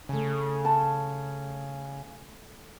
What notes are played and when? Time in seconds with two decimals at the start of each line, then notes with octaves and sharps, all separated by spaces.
0.09 C#3 A3 G#5
0.65 A5